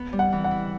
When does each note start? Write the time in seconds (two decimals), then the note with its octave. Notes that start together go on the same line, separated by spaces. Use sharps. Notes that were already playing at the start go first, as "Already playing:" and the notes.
Already playing: B3
0.13 G3
0.19 F#5
0.32 E3
0.44 F#5
0.51 E4